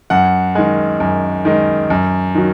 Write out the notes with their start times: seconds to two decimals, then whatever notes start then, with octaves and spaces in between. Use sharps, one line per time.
0.10 F#2 F#5
0.55 D#3 G#3
1.00 F#2
1.45 D#3 G#3
1.90 F#2
2.35 D#3 F#3